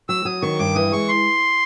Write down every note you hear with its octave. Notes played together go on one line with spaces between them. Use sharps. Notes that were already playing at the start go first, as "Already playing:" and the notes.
F#3 E6
F#3 D#6
D#3 C#6
G2 D6
E3 D#6
G#3 C#6
C6